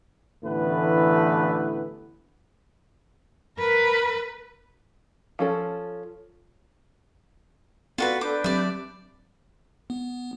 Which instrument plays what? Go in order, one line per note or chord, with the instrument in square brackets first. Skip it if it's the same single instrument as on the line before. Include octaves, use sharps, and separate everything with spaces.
[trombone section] A1 D3 E3 A3 B3 B4
[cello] A#4 B4
[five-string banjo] F3 C#4 A4
[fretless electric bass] B3 [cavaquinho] F4 F#4 B4 [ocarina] A4 [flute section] D5
[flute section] D4 B4 G6 [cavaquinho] D6
[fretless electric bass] F#3 C4 [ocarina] G4 [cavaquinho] D5 E5
[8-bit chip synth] B3